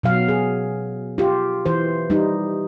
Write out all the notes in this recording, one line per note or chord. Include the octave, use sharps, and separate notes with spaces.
B2 F#3 F5
G#4
F4 G4
E3 C5
G3 D#4